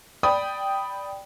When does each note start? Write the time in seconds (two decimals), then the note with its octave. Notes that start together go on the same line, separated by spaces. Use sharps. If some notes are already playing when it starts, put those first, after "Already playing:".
0.23 D5 G5 B5 D#6